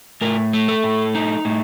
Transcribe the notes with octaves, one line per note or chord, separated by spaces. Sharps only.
A2 A#4
A3
A4
A2
D#4
A2